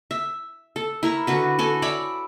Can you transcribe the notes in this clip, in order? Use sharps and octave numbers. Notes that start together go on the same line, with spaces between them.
E5
A4
E4 A#4 C#6
D3 F#4 B4
F#4 A4 G#5
C#5 D5 E5 B5